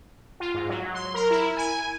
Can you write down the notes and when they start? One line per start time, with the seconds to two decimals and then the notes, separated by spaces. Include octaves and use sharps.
0.40 F4
0.54 G#2
0.69 F#3
0.94 C6
1.14 A#4
1.31 E4
1.57 G#5